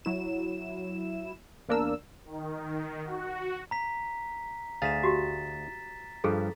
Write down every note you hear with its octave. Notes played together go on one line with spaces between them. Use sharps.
F#3 E4 E7
E2 A#3 D4 A#4 E6
D#3
F#4
A#5 B6
D2 G#4 F5 A6 B6 E7
F#4 G4
G2 F3 G#4 A4